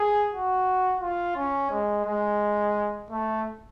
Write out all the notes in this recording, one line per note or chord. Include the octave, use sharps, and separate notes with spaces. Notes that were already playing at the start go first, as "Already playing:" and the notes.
Already playing: G#4
F#4
F4
C#4
G#3
G#3
A3